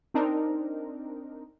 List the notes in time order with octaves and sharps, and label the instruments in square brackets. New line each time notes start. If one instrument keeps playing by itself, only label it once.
[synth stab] C4 D4 D#4 A#4